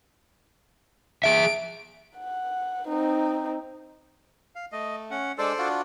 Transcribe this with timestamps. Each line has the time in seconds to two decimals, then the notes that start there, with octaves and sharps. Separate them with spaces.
1.24 G#4 E5 D7
2.17 F#5
2.88 C4 D#4
4.55 F5
4.72 A3 D#5
5.11 C#4 F#5
5.38 G#3 D4 A4 C5 D5 E6
5.58 D4 F4 F#4